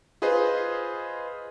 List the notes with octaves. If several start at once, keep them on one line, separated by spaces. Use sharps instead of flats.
F4 G#4 B4 C5 D#5